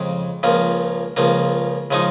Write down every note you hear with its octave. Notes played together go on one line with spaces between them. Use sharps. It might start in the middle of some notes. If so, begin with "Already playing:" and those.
Already playing: F2 C#3 G#3
C#2 C#3 F3 A#3
C#2 C#3 F3 A#3
C#3 F3 G#3 D#4